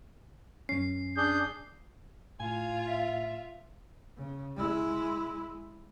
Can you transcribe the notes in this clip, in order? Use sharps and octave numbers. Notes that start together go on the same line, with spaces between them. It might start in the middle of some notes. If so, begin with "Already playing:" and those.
F#2 C#4 C7
D4 G#4 G6
A2 F4 F5 G#5
E5
C#3
G#3 E4